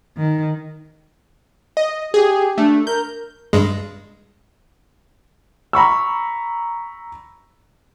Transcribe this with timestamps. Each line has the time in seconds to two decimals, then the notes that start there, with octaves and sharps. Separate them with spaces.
0.17 D#3
1.77 D#5
2.14 G4 G#4
2.58 A3 D4
2.87 A#4 G6
3.53 G2 G#3
5.73 A#5 B5 C#6 E6